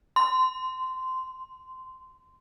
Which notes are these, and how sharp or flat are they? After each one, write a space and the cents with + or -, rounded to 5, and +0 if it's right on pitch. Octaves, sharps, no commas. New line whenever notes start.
C6 -20